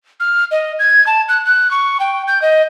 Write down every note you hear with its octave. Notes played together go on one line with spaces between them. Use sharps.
F6
D#5
G#6
A5
F#6
F#6
C#6
G5
G6
D#5